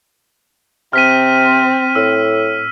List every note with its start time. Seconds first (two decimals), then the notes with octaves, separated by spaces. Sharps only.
0.93 C3 C4 F6 B6 D#7
1.95 A2 E6